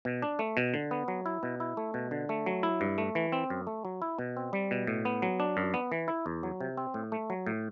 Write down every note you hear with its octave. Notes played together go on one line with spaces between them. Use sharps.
B2
D4
A3
B2
D3
B3
F#3
E4
B2
E4
A3
B2
D3
A3
F#3
E4
G2
A3
E3
C4
F#2
A3
F#3
E4
B2
C4
G3
B2
A2
B3
F#3
D4
F#2
B3
E3
E4
E2
F#3
C3
C4
A2
A3
F#3
A2